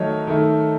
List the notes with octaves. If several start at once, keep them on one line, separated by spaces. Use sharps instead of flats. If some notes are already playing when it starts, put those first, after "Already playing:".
Already playing: D#3 F#3 A3 C#5 D#5
D#3 A3